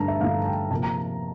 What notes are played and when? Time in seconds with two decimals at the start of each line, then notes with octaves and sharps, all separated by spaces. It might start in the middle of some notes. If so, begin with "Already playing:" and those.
Already playing: G2 D3 A3 D4 A5 A#5
0.08 E5
0.21 G2 D3 A3 D4 F5
0.45 G5
0.71 C3 F3 A#3 A5
0.83 A#5